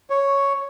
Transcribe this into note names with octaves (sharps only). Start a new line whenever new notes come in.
C#5